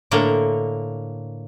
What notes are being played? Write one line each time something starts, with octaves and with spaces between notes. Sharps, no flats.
A2 D3 A#3